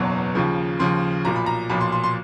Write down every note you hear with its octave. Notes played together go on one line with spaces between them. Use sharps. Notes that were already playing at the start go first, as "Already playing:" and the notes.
Already playing: F#1 E2 B2 F#3
D#2 C#3 F3
D#2 C#3 F3 C6
B1 A#2 F3 A#5
B5
A#5
B1 A#2 F3 B5
C6
C6
C6